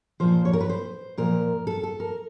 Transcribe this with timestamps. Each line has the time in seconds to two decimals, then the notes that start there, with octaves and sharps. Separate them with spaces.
0.20 A#2 F3 C5
0.45 C#5
0.53 A#4
0.60 B4
0.69 C5
1.18 A#2 F3 A#4
1.67 A4
1.83 A4
2.00 A#4